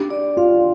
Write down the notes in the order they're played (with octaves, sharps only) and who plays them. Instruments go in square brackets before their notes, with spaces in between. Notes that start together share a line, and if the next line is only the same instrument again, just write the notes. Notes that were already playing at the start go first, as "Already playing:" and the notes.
Already playing: [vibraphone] D4 [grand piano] G4
[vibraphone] D5
[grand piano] F4 [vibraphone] F5